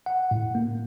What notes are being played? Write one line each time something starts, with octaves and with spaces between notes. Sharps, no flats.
F#5
A2
A#3